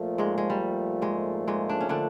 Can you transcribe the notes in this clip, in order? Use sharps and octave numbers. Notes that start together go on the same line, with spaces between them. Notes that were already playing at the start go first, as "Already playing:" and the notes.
Already playing: A#2 F3 A3
G#2 G#3
G#3
G3
G#2 G#3
G#2 G#3
D4
C#4
D3 D4